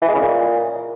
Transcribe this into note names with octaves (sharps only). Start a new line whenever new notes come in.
E3
G#3
C#3
A#2